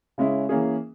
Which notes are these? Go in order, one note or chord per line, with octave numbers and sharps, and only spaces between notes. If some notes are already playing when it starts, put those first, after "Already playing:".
C#3 G#3 C#4 E4
E3 A#3 C#4 G#4